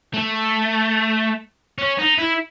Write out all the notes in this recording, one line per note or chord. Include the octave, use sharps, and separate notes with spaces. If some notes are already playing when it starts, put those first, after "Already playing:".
A3
C#4
D#4
E4